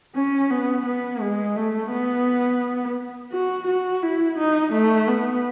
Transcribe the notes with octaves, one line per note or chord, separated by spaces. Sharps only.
C#4
B3
B3
G#3
A3
B3
F#4
F#4
E4
D#4
A3
B3